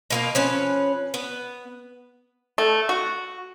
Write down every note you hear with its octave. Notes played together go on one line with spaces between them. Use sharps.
B2 A#3 F4
F3 C#4 B4
B3
A3
F#4